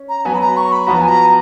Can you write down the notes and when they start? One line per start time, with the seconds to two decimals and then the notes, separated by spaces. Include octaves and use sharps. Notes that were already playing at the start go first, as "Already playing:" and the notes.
Already playing: C#4
0.09 A#5
0.25 F#3 B3 F#4 G#5
0.35 B5
0.41 A#5
0.57 C#6
0.72 B5
0.87 F3 B3 F#4 A#5
1.02 G#5
1.08 A#5